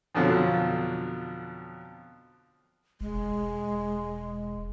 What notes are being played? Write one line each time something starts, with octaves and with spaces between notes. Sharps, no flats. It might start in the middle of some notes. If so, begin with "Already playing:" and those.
F2 B2 D3 F3 F#3
E1 G#3